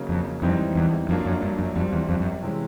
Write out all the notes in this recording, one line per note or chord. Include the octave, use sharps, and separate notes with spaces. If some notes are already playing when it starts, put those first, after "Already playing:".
Already playing: C#3 F#3 A#3 D#4
F2
F2 G#2 E3 G3 C4 D#4
E2
F2 F#3 A#3 D4 F4 A#4
F#2
G2
F#2
F2 G3 C4 F4
E2
F2
F#2
C3 E3 G#3 C#4